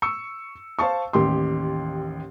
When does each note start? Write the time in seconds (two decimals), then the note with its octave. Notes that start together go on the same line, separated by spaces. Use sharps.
0.02 C#6 E6 C#7
0.79 C5 F5 A5 C#6
1.13 A1 D#2 G4 C6